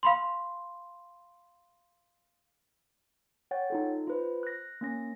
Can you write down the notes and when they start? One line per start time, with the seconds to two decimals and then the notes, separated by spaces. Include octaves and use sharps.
0.03 F5 B5 C6
3.51 C#5 F#5 G5 A6
3.70 D#4 F4 A4
4.07 F4 B4 C5
4.43 F#6 A#6
4.81 A#3 C#4 A#6